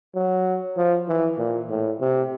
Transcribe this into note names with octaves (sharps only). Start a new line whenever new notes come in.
F#3
F3
E3
A#2
A2
C3